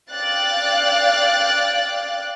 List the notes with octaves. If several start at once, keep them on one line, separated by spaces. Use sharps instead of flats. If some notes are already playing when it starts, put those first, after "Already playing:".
D5 F5 G5 F#6 A6